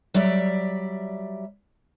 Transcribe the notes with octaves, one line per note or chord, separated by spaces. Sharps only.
F#3 G3 D5 E5